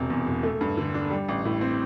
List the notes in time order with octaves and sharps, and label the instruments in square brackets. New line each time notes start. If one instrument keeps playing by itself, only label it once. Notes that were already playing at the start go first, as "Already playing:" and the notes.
Already playing: [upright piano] E1 C3
E2
E1
A3
G2
D3
D4
G3
A1
A2
C4